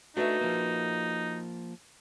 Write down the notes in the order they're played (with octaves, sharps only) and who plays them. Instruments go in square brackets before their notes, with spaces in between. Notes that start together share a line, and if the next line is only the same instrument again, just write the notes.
[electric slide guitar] A3 D4 [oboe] D#4 [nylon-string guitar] F#4 B4 E5
[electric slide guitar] F3 A#3